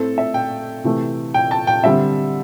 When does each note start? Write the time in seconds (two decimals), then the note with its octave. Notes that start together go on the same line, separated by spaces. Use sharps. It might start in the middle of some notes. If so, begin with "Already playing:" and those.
Already playing: A2 A3 C4 A4
0.18 E5
0.34 G5
0.84 C3 E3 A3
1.34 G5
1.51 A5
1.67 G5
1.84 D3 G3 C4 E5